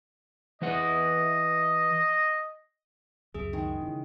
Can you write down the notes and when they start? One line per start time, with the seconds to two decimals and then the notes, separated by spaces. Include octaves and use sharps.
0.62 E3 B4 D#5 F#5
3.34 C#2 F#2 G#4 E5
3.53 D#3 G#3
3.81 C#3 E3